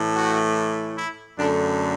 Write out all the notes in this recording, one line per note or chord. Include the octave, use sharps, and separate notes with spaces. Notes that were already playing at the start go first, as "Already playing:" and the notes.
Already playing: A2 E3 A3
F#4
E4
F#2 D3 A3 D4